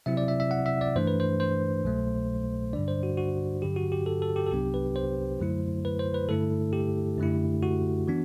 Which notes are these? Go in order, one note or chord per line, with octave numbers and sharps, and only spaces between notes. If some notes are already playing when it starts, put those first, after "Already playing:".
C3 F#3 C4 E4 E5
D5
E5
E5
F#5
E5
D5
G2 E3 A3 D4 C5
B4
C5
C5
C2 B2 F#3 A3
G2 D3 G3 D4 D5
C5
F#4
F#4
G2 D3 F#3 G4
F#4
G4
A4
A4
G4
A4
C2 C3 F#3 B3 D4 G4
B4
C5
F#2 D3 F#3 A3 E4
B4
C5
B4
G2 D3 A3 E4 A4
G4
F#2 D3 A3 E4
F#4
E3 B3 D4